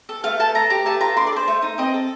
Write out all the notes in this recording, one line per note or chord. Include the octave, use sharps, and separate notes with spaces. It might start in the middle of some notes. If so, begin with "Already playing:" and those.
A4
A3 F5
A4 A5
A3 A#5
G4 A#5
A3 A5
F4 A#5
D4 C6
D5
A4
C5
A3
D#4
C4 D#5
A4